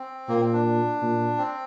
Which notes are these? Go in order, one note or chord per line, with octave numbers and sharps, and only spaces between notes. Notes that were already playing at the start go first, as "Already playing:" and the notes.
Already playing: C4
A#2 A#3
C4
D4
A#2
C4